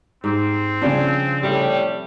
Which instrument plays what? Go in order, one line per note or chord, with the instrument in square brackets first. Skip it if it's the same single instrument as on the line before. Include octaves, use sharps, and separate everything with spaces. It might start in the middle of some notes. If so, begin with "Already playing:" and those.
[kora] G#2 G4 [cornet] C4
[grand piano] C#3 D4 [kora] F3 G3 C#5
[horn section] A2 G3 [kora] C3